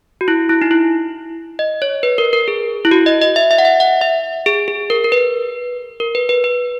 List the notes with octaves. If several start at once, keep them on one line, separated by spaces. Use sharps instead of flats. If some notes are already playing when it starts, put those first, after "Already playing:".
F#4
E4
E4
D#4
E4
D#5
C#5
B4
A#4
A#4
G#4
E4
F#4
D#5
D#5
E5
E5
F#5
E5
F#5
E5
G#4
G#4
A#4
A#4
B4
A#4
B4
B4
B4